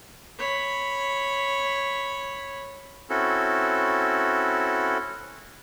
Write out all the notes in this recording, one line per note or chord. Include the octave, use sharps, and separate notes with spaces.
C#5 B5
C4 C#4 E4 F#4 A4